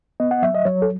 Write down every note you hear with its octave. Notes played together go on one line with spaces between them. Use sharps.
B3 D#5
F#5
F#3 E5
D#5
F#3 C#5
A4